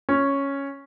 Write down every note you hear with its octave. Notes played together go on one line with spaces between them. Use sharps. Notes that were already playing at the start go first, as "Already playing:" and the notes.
C#4